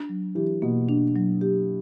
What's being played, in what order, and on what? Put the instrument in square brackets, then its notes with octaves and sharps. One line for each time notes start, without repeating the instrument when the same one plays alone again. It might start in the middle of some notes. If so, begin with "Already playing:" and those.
Already playing: [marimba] D4
F#3
[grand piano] E3 [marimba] G4
[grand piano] B2 [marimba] A#3
[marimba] D4
F#3
G4